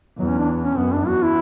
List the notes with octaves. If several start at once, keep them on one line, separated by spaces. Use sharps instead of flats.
E2 F#3
C#4
D4
C#4
F#2 B3
D4
E2 F#4
E4